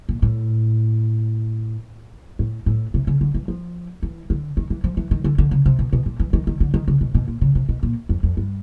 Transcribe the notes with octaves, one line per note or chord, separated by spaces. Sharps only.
A#2
A2
A2
A2
C3
C#3
D3
E3
F3
E3
D3
D#3
E3
F3
E3
D#3
D3
D3
C#3
C3
B2
B2
A#2
E3
D#3
D#3
D3
D#3
C#3
B2
B2
A#2
C#3
C3
B2
A#2
F2
F2
G2